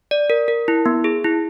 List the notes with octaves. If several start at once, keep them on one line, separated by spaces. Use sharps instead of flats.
D5
A#4
A#4
E4
B3
G#4
E4